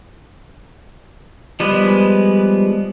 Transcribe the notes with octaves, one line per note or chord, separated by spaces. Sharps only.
F3 G3 G#3 B3 B4